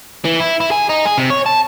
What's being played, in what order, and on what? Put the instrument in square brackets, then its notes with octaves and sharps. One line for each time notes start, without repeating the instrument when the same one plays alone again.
[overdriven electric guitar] E3
E4
E4
G#4
D#4
G#4
C3
C#5
A5